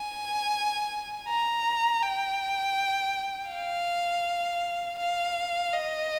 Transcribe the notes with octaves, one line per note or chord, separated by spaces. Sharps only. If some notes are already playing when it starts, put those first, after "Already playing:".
Already playing: G#5
A#5
G5
F5
F5
D#5